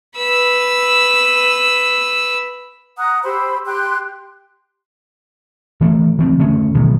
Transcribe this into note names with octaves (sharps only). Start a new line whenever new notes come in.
B4 E6
F#5 A#5 D#6 F#6
G4 C5 B5 E6
G4 G5 C6 F#6
E3 A3 A#3
E3 F3 A3 C4
D3 A3 C#4
A1 B2 D#3 F#3